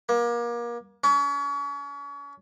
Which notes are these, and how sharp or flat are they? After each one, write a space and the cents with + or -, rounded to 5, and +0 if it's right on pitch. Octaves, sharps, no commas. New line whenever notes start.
A#3 +30
C#4 +35